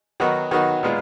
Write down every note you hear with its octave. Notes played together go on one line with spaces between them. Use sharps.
D#3 F#3 B3 D#4 F#4
D#3 F#3 B3 D#4 F#4
A#2 G#3 B3 F4